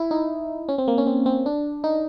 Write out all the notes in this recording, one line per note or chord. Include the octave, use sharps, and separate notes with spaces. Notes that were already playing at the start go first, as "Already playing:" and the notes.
Already playing: E4
D#4
C#4
C4
A#3
C#4
C4
C4
D4
D#4